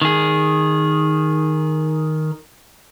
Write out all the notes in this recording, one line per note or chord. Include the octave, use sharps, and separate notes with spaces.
D#3 G#4